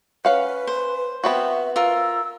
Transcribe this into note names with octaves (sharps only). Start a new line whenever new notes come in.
C#4 B4 F5 F#5
C5
B3 C4 F#4 E5
F4 A#4 E6